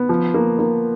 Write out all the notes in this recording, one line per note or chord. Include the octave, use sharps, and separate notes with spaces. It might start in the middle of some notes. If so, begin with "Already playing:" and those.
Already playing: B3
F3
A#3
A#3